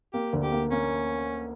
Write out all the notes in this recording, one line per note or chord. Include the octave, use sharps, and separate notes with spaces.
A#3 G4
D2
G4
A#3
A#3 C#4